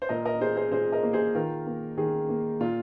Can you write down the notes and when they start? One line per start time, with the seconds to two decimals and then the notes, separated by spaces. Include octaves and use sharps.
0.02 C5
0.09 A#2 A#4 D#5
0.25 A#4 D#5
0.40 A#3 G#4 C5
0.56 G#4 C5
0.71 A#2 G#4 C5
0.92 A#4 D#5
1.03 A#3
1.13 G#4 C5
1.35 D#3 F4 A#4
1.67 A#3
1.97 D#3 G#4
2.29 A#3
2.61 A#2 F4